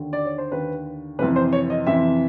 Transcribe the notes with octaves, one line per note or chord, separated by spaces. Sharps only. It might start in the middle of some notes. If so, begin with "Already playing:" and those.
Already playing: D#2 D3
D5
C#5
C5
D#2 D3 B4
F2 C3 E3 B4
C5
C#5
D#5
F2 C3 E3 E5